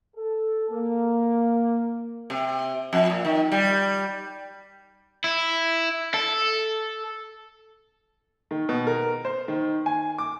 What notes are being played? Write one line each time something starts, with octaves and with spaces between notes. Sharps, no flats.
A4
A#3
C3
F2
A#2
D#3
G3
E4
A4
D#3
B2
A#4
C5
D#3
G#5
D6